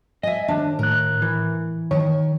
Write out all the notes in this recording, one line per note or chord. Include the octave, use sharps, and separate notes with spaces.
D#5 E5 G#5
D#2 D4
A2 A#4 F#6
E3
D#3 C#5